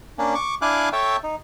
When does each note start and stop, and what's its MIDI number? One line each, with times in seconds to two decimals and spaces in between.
0.18 0.34 58
0.18 0.34 61
0.18 0.34 62
0.35 0.55 85
0.35 0.55 86
0.62 0.89 62
0.62 0.89 64
0.62 0.89 77
0.62 0.89 80
0.62 0.89 86
0.62 0.89 90
0.93 1.16 69
0.93 1.16 73
0.93 1.16 76
0.93 1.16 79
0.93 1.16 81
1.23 1.35 63